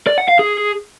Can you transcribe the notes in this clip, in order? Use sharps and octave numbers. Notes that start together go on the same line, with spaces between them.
D5
F#5
F5
G#4